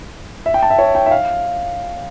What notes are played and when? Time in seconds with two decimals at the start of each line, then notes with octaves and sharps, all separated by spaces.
0.46 E5
0.54 G5
0.62 A5
0.70 E5
0.78 C#5
0.95 G5
1.06 E5
1.11 F5